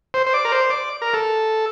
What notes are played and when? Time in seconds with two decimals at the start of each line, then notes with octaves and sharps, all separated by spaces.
0.14 C5
0.27 C5
0.34 D5
0.45 A#4
0.52 C5
0.70 D5
1.02 A#4
1.14 A4